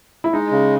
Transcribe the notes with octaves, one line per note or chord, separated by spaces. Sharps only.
E4
G#3 D#4
C#3